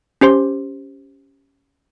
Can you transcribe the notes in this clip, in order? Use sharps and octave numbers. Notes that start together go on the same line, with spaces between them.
C#4 G4 C5 C6